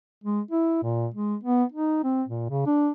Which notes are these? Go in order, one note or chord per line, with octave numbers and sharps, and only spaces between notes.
G#3
E4
A#2
G#3
B3
D#4
C4
A#2
C#3
D4